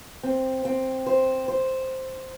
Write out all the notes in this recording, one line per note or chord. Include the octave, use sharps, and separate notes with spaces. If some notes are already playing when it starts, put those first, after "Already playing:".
C4
C4
C5
C5